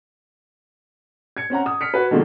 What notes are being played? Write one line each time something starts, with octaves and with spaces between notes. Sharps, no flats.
G#6 C#7
C4 C#4 F#5 A#5
D#6
F6 B6 C#7
F#4 B4
B2 D3 D#3 F3 G#3 A#3